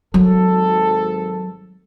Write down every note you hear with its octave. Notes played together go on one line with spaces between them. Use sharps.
G#1 F#3 A4